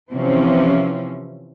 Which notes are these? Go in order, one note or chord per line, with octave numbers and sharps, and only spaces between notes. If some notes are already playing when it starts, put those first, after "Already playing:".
C3 E3 F3 C4 C#4